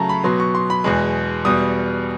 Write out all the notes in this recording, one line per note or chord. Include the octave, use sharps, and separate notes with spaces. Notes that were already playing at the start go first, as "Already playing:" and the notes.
Already playing: C#3 F#3 A3 A5 A#5
B5
B2 F#3 B3 C6
C#6
C6
B5
E2 B2 G#3
E2 B2 G3 D#6